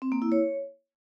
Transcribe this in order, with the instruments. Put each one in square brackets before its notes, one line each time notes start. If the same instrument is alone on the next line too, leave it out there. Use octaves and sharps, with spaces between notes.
[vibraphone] C4
A#3
E4
C#5